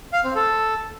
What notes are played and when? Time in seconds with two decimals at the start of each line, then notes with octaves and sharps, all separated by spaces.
0.13 F5
0.24 C4
0.35 A4